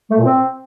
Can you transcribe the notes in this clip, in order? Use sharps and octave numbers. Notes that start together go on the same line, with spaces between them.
A3
A#2
C4